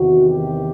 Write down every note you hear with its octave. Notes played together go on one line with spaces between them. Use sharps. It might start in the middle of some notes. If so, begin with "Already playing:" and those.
Already playing: E2 C3 D#3 F#4
G4